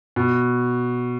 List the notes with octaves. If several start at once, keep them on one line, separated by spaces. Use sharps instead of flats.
B2